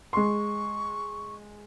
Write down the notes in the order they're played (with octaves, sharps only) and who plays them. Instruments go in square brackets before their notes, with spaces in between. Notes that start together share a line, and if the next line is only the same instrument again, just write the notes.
[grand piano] G#3 C6 [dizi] C#6